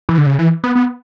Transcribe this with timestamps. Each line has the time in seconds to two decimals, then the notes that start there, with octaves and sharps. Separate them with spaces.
0.09 E3
0.18 D3
0.26 C#3
0.39 E3
0.64 B3
0.75 B3